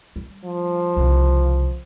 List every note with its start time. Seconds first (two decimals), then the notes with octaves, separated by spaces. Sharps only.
0.16 G3
0.45 F3
0.97 C2 C#3